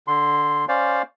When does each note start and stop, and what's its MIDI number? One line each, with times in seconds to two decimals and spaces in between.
0.07 0.65 50
0.07 0.65 84
0.69 1.02 61
0.69 1.02 72
0.69 1.02 74
0.69 1.02 77